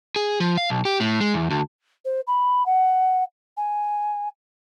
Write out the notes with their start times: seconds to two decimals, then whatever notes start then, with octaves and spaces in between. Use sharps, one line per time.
0.16 G#4
0.40 F3
0.57 F5
0.70 B1
0.85 G4
1.00 A2
1.21 G#3
1.34 E2
1.51 D2
2.05 C5
2.27 B5
2.66 F#5
3.57 G#5